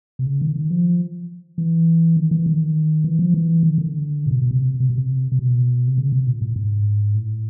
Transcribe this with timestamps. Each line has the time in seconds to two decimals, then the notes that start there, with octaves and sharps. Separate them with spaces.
0.19 C3
0.27 C#3
0.41 D#3
0.55 D#3
0.70 F3
1.58 E3
2.17 D#3
2.31 E3
2.46 D#3
3.04 E3
3.19 F3
3.34 E3
3.63 D#3
3.78 D3
4.26 A#2
4.31 B2
4.42 B2
4.51 C3
4.80 C3
4.90 B2
4.98 C3
5.32 C3
5.39 B2
5.88 C3
5.98 C#3
6.12 C3
6.27 A#2
6.42 A2
6.56 G#2
7.15 A2